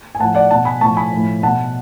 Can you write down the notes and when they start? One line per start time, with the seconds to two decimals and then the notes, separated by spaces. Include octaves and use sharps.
0.15 G#5
0.19 A2 F3 F#5 A5
0.35 D5 F#5
0.51 B2 F#5 A5
0.65 G#5 B5
0.81 A2 F3 A5 C#6
0.97 G#5 B5
1.11 A2 F3
1.43 B2 F#5 A5